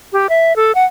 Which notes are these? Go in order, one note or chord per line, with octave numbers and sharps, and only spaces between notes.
G4
E5
A4
F#5